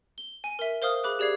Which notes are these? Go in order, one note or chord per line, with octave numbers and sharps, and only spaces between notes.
G7
G#5 D#7
A#4 E5
A#4 C5 F5 D#6 F6
G#4 B5 D6 F#6
G4 G#4 D5 G#6 C7